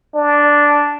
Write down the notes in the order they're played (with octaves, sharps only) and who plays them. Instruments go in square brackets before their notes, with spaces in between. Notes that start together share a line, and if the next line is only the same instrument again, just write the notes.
[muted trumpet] D4